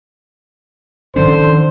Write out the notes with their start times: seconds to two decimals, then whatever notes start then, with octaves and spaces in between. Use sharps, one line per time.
1.16 D3 D#3 F3 C#4 C5